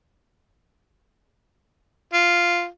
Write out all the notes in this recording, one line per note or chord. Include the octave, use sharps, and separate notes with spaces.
F4